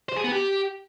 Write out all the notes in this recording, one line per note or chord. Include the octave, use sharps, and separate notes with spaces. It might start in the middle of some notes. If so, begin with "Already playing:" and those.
C5
G#4
B3
G4